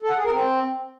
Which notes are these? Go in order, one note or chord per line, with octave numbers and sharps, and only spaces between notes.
A4
F#5
G#4
A#4
C4